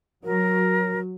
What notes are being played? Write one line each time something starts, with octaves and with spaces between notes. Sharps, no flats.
F#3 A#4